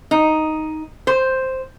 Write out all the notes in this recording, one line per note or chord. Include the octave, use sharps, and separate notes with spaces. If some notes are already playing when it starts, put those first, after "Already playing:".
D#4
C5